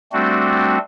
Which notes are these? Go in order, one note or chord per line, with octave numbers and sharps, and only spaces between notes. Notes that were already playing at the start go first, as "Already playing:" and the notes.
G3 A3 C4 D4 F#4